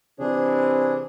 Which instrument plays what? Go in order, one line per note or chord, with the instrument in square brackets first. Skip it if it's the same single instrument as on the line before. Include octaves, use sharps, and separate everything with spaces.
[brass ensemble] C3 E3 C5 [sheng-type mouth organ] D4 G#4